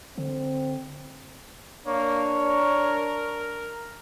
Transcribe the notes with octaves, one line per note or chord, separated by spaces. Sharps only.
D3 C4
A#3 D4 C#5
A#4